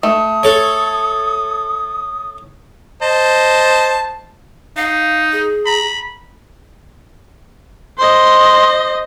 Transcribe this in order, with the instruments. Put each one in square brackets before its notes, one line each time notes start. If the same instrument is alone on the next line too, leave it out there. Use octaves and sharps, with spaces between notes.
[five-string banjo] A3 [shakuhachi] D#6
[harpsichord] A4 C#5
[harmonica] C5 D#5 A5
[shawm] D#4 [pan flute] F5
[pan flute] G#4
[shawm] A#5 [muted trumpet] B5
[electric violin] C5 D#5 [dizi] C6